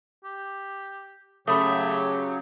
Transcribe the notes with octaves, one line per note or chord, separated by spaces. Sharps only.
G4
C#3 F#3 A3 G4 B5 D#6